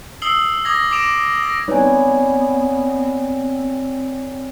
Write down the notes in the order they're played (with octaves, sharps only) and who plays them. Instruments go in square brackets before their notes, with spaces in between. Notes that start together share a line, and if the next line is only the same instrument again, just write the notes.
[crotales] D#6 E6 C7 F#7 G7
D6 D#6 G#6 A#6
D6 A#6 D7 E7 F7
A#6
[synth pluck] G3 D#4 B4 [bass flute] B3 [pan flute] C4 [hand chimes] C#5 D5 G#5